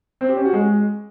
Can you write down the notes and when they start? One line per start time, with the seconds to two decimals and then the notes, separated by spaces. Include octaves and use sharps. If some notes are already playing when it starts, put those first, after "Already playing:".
0.21 C4
0.29 G4
0.37 C#4
0.45 F#4
0.53 G#3